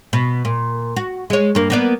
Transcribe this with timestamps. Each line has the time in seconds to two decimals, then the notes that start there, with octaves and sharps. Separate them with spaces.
0.13 B2
0.45 A#2
0.96 F#4
1.30 G#3 C#5
1.55 G2 A#3
1.70 A#3 B3 D5